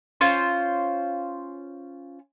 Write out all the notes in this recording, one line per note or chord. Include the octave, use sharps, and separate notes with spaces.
C#4 F4 C5